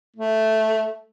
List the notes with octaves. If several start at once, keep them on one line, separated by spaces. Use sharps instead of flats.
A3